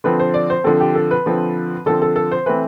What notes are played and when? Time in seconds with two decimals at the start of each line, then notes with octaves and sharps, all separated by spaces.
0.04 D3 F3 C4 B4
0.20 C5
0.34 D5
0.50 C5
0.64 D3 F3 C4 A4
0.80 G4
0.95 A4
1.11 B4
1.26 D3 F3 C4
1.86 D3 F3 C4 A4
2.02 A4
2.16 A4
2.32 C5
2.46 E3 A3 C4 B4